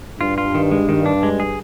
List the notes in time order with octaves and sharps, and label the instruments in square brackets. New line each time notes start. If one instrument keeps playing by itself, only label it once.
[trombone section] G2 [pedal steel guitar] F4
[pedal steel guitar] F4
D#3
G#3
D#3
D4
G#3
G#4